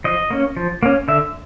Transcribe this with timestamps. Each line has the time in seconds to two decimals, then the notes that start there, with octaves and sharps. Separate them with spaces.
0.04 F3 D#5
0.30 A#3 C#4
0.57 F3
0.83 A#3 C#4
1.08 D3 E5